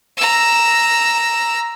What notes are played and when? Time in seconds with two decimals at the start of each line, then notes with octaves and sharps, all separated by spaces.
0.17 A#5 E6